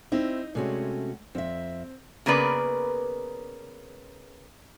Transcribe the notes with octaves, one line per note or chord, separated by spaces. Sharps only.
C4 D#4 E4
C3 G#3 A3 C#4 F#4
F2 C4 E5
C#3 A#3 B3 A#4 B4 D5